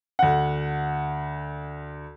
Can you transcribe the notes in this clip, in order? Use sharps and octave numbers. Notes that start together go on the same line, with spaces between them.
D2 F#5